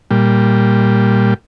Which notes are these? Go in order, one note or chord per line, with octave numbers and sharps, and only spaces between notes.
A#2 G3